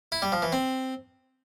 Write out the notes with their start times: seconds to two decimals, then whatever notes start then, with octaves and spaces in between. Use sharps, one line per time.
0.12 E4
0.22 G3
0.32 F3
0.42 E3
0.52 C4